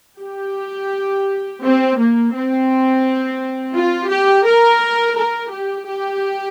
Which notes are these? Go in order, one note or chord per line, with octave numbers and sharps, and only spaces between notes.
G4
C4
A#3
C4
F4
G4
A#4
A#4
G4
G4